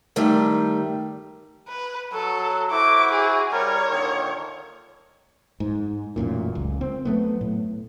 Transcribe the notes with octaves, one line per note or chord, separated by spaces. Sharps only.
G2 D#3 G3 A3
B4
F#3 A4
E4 F#4 C5 D6
G#4
C2 G3 A#4 C#5
A#2 D3 D#3
G#2
E1 A1 F#2 A#2
C#2
C4
F#3 A3 B3
A2